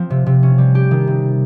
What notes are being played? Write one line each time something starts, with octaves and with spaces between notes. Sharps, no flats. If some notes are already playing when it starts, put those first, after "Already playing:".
Already playing: F3 C4
C3
C3
C#4
G3
G4
D#3
C3